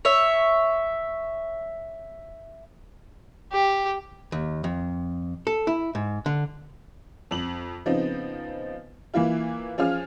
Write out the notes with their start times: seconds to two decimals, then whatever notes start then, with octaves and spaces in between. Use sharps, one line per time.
0.05 C#5 E5
3.52 G4
4.32 D#2
4.64 F2
5.47 A4
5.67 E4
5.95 G#2
6.26 D3
7.31 F2 F#7
7.86 C#3 F3 B3 C4 D#4
9.14 E3 A#3 E4 F4
9.78 F3 C#4 F4 G#4 F6